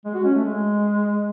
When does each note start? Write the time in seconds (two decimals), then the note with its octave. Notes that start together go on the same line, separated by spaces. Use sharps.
0.05 G#3
0.14 F#4
0.24 C#4
0.35 A3
0.45 G#3